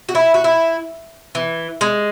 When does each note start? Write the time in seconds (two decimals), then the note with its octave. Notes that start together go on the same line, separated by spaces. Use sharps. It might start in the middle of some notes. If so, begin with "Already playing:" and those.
0.09 F#4
0.15 E4
0.34 F#4
0.44 E4
1.35 E3
1.81 G#3